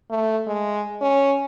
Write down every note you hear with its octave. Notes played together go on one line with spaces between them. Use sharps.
A3
G#3
C#4